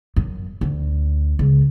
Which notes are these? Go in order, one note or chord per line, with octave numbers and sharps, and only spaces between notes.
F#2
D2
C#2